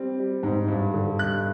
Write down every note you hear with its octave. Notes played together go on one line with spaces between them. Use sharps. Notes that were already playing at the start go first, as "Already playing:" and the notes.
Already playing: G3 C4
G3
G#2
G2
D3
G2 F#6